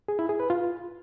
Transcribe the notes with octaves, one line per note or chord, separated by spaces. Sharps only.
G#4
E4
G#4
B4
F4